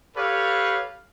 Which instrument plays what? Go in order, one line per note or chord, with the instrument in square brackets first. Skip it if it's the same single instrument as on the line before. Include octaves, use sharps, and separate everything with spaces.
[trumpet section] G4 A4 B4 C#5 F5